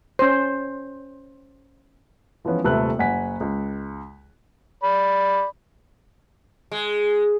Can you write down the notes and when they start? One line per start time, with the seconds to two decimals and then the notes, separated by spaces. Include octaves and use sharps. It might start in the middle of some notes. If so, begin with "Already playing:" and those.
0.19 C#4 C5
2.45 E3 F3 G#3 B3 C#4
2.64 D#1 C3 A3 B4 F#6
2.99 F#1 F#5 G#5 B6
3.41 C#2
4.83 D5 B5
6.71 G#3